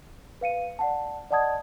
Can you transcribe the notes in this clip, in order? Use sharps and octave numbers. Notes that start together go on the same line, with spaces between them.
B4 F5 C#7 D#7
D5 F#5 A5
D5 D#5 F#5 A5 D#6 G#6